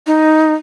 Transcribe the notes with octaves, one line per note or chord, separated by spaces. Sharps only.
D#4